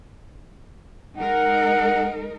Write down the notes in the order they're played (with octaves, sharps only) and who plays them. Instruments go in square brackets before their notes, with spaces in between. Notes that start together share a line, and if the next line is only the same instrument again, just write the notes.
[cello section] G#3 D#4 A#4 [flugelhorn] F#5